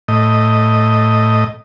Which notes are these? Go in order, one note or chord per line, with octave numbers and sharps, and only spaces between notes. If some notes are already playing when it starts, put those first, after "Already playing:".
A2 D#5